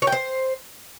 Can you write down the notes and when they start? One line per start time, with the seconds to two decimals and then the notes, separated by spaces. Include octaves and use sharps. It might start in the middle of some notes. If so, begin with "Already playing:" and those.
0.02 C#5
0.07 G5
0.12 C5